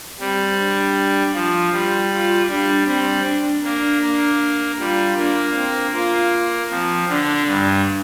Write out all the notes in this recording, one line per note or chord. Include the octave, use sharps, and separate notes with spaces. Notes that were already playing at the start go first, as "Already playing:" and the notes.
G3 C4
D4
F3 F4
G3
F4
G3 D4
G3 C4
D4
A#3 D4
A#3
G3 F4
A#3 D4
C4
A#3 F4
F3 C4
D3 D4
G2